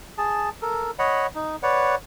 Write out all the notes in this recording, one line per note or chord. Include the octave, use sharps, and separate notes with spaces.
G#4 A5
A4 A#4
C#5 D#5 F#5 B5
D#4
B4 C#5 D5 F#5